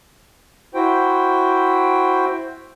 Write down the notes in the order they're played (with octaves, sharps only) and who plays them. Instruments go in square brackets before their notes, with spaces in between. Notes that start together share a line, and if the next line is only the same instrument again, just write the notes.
[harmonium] E4 F#4 C5 G5